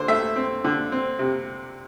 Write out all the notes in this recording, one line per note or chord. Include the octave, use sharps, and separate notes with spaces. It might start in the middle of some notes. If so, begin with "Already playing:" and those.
Already playing: D3 C5
A3 E5
C4
D3
C4
C3